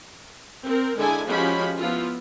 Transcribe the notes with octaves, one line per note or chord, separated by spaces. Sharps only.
C4 A#4
D3 G#3 E4 G#4 A4 G#5
F3 G#3 C#4 F#4 G4 B5
F3 B3 E4 F4